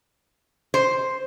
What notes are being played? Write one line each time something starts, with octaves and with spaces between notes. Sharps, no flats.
C5